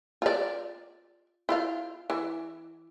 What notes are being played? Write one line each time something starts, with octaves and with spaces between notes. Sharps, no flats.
F4 D5
E4 F4 F5
E3